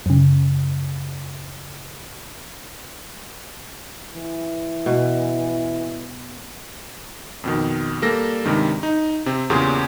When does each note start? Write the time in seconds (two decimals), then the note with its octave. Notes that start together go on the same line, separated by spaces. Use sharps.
0.06 F#2 C#3
4.14 E3
4.86 B2
7.44 F2 B2 D#3
8.02 G3 A#3 A4 A#6
8.45 G2 C3 D#3 G#3
8.83 D#4
9.26 C3 C4
9.50 E2 A#2 C#3 G4 G#4 C6